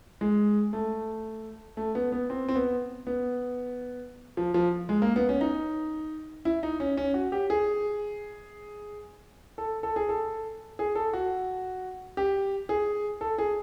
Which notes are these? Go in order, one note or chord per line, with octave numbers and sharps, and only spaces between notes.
G#3
A3
A3
B3
B3
C4
C4
B3
B3
F3
F3
G#3
A#3
B3
C#4
D#4
E4
D#4
C#4
C#4
F#4
G4
G#4
A4
A4
G#4
A4
G#4
A4
F#4
G4
G#4
A4
G#4